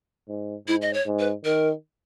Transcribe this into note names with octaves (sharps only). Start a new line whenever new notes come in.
G#2
G#2 E4
D#5
C#5
G#2
B4
D#3 A#4